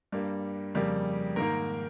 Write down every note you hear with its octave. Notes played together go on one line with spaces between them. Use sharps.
G2 G3 A#3
F2 C#3 G3 A#3
G#2 D#3 A#3 A#4